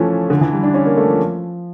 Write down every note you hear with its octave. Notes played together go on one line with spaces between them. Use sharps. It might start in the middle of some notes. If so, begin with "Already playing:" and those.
Already playing: E3 F3 A3 C#4
D3
E3
G3
D4
C#4
A#3
A3
F3